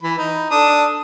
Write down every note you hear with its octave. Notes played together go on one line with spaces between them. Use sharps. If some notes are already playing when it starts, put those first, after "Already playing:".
E3 B5
D#4
D4 A4 D#6